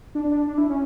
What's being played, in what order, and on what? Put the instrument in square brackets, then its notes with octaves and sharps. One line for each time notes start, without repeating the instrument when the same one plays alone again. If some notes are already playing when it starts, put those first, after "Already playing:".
[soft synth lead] D4
D4
D4
E4
C#4